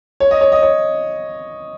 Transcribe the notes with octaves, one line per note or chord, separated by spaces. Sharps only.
C#5
D#5
C#5
D#5
C#5